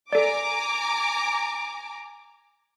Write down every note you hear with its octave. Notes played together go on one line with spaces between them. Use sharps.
A4 D5 G#5 A#5 D6